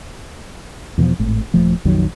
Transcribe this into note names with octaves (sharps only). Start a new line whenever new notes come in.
E2 B2 E3 F3
G#1 A2
D#1 F3 A3
A#1 F2 D#3 F#3